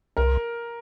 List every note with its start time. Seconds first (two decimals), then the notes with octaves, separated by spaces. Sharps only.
0.17 C2 A#4